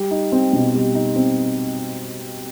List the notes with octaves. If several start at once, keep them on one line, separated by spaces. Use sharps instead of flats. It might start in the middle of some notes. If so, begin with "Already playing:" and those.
Already playing: G3
D#4
C4
B2
G3
D#4
C4